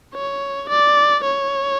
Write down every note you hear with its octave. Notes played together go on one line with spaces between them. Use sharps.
C#5
D5
C#5